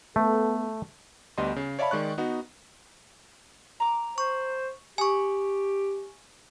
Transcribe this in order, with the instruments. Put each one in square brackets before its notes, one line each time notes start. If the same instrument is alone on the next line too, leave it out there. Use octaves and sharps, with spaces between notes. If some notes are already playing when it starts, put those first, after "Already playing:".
[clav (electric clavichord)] A3 [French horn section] B3 A4
[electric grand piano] D2 G3 B3 D#5 C6
C#3
C#5 D5 E5 F5 A5 B5
D#3 G#3 D5 C#6 F#6
B3 D#4 F#4
[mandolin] A#5 D6
[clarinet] C5 [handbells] C#6
[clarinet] G4 [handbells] G#5 C#6 [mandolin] D#6